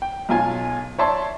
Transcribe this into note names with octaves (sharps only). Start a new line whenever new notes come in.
G5
B1 F4 G#5
C#5 D5 E5 A5 C6